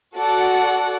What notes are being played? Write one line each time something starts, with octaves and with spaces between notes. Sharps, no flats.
F#4 A4 D5 F#5